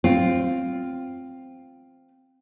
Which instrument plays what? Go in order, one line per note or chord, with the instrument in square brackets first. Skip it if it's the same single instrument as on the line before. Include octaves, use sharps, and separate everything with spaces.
[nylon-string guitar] C4 F4